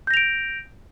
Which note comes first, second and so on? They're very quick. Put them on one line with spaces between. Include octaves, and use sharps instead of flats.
G6 A#6 F7 D7